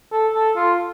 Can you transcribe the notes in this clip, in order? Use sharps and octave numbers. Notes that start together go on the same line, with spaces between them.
A4
A4
F4